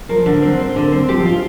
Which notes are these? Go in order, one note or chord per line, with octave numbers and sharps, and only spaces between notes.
F3 A#4
D3
C4
C4
D3
C4
F3 G4
F4